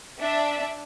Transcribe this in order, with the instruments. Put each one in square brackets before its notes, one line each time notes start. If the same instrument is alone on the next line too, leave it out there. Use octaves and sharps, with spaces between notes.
[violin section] D4 E5